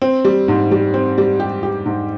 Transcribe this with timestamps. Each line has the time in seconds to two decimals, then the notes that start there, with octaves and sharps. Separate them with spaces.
0.02 C4
0.25 G3
0.48 G#2
0.71 G3
0.94 C4
1.18 G3
1.40 G4
1.63 G4
1.86 G#2